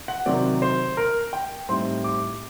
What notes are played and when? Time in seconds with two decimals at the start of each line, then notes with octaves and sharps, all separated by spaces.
0.08 F#5
0.26 C3 D#3 F#3 C4 D5
0.62 C5
0.97 A#4
1.33 G5
1.69 A2 G3 C4 D#4 C6
2.04 D6